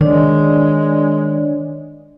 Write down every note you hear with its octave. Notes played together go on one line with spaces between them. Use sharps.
D#3 G#3 D4 C#5 D5